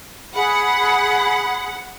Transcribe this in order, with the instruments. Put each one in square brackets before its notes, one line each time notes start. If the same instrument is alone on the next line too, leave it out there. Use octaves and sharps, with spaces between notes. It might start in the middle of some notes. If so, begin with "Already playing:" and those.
[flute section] G#4 B5 [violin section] F#5